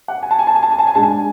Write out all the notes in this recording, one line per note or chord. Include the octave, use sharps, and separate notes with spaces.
F#5
G#5
A5
G#5
A5
G#5
A5
G#5
A5
G#5
G#2 G#3 D4 A5
G#5